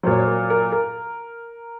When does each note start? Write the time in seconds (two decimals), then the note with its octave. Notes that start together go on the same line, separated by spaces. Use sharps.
0.03 F#3 C5
0.07 A#2 C#5
0.18 C5
0.27 A#4
0.50 A#4
0.72 A#4